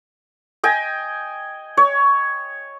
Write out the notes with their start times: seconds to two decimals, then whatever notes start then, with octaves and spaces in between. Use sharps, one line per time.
0.64 D#5 G5 G#5
1.77 C#5